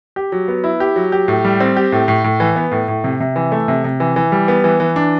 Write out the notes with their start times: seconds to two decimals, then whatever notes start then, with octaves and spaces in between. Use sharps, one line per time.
0.16 G4
0.32 F#3
0.48 B3
0.64 E4
0.80 G4
0.96 F#3
1.12 G4
1.28 A2
1.45 G3
1.60 C4
1.76 G4
1.92 A2
2.08 A2
2.24 A2
2.40 E3
2.56 B3
2.72 A2
2.88 A2
3.04 C3
3.20 C3
3.36 E3
3.52 A3
3.68 C3
3.84 C3
4.00 E3
4.16 E3
4.32 G3
4.48 B3
4.64 E3
4.80 E3
4.96 D4